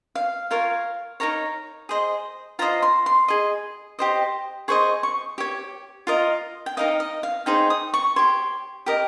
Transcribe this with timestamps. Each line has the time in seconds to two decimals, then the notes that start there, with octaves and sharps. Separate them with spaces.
0.15 F5
0.51 F4 A#4 C#5 F5
1.20 D#4 A#4 C#5 A#5
1.89 G#4 C5 D#5
2.59 F4 C5 D#5 A#5
2.82 C6
3.06 C6
3.28 G#4 D#5
3.99 G4 C5 D#5
4.68 G#4 C5 D#5 C#6
5.03 C#6
5.38 G4 C#5
6.07 F4 A#4 D#5
6.66 G5
6.77 D#4 A#4 D#5 F5
7.00 D#5
7.23 F5
7.46 D#4 G#4 C5 G5
7.70 D#6
7.94 C#6
8.16 G4 C#5 C6
8.86 G4 A#4 D#5